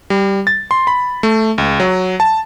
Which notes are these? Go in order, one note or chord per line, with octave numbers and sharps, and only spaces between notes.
G3
A6
C6
B5
A3
C#2
F#3
A5